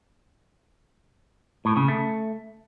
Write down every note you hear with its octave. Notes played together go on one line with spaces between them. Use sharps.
A2
C#3
A3